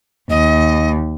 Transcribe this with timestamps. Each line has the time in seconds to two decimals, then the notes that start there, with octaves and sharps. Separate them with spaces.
0.30 D#2 D#5